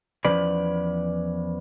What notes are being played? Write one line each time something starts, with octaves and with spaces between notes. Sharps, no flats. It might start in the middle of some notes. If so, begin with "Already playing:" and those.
E2 F3 C#4 B4 D5